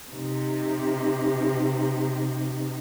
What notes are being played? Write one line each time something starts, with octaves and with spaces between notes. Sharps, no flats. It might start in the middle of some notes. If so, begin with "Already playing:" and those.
C3 D#4